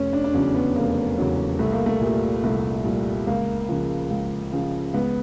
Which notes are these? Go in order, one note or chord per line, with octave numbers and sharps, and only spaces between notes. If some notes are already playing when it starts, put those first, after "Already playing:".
Already playing: F1 C#4
D4
D4
E2 C#3 F#3 C#4
B3
F1 A#3
E2 C#3 F#3
C2 A3
A#3
A3
A#2 G3
C2 A3
A#2 G3
C#2 A#3
C#3 F3
C#2
C#3 F3
C#2 B3